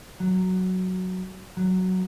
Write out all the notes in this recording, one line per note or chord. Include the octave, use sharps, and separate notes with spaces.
F#3
F#3